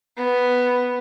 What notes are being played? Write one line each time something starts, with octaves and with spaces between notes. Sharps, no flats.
B3